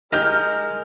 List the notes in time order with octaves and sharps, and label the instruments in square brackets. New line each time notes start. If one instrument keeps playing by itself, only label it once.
[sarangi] G#3 [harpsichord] D#4 G4 D#5 [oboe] A#4 [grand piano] F6 G6